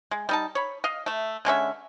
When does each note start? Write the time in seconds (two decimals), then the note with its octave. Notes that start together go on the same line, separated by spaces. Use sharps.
0.11 G#3
0.29 G3 D#4 A5
0.55 C#5 B5
0.84 D#5 F5
1.06 A3 E5
1.45 D3 G#3 C#4 E5